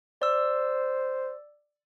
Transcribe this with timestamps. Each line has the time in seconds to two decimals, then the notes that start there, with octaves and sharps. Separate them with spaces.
0.22 C5 D5 E6